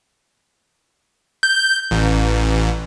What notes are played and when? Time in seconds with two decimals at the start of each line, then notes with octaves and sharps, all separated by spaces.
1.43 G6
1.91 A1